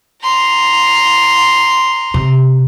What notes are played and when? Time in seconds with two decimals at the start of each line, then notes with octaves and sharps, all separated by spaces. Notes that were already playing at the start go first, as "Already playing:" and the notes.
0.23 A#5 C6
2.14 C3